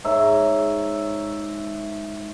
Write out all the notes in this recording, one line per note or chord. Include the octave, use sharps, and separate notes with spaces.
G#2 C#5 E5 A#5